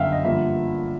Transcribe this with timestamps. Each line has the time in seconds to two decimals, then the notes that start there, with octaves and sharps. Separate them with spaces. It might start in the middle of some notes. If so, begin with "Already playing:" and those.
Already playing: G1 F#2 D3 E5 F5 G5
0.12 D#5
0.24 G2 D3 F3 A#3 E5